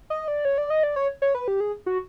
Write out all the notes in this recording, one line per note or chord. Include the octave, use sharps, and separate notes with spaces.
D#5
D5
C#5
D5
D#5
D5
C#5
C#5
B4
G4
G#4
F#4